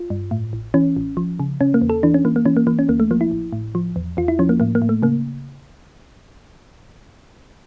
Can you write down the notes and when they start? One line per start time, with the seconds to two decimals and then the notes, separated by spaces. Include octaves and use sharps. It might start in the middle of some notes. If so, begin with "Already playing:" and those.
Already playing: F4
0.10 G2
0.31 A2
0.53 A1
0.74 E3 C#4
0.96 A1
1.17 F3
1.40 C#3
1.61 C#3 C#4
1.74 A#3
1.82 E2
1.90 A4
2.03 E3 D4
2.14 C#4
2.25 E3 A#3
2.36 A#3
2.46 E3 C#4
2.57 A#3
2.67 E3 A#3
2.79 C#4
2.89 D2 A#3
3.00 A3
3.11 F3 A#3
3.21 E4
3.31 A1
3.53 A2
3.75 F3
3.96 E2
4.17 E2 F4
4.28 E4
4.39 F3 C#4
4.49 A#3
4.60 A2 A#3
4.75 A#3
4.82 A2
4.89 A3
5.02 C#3 A#3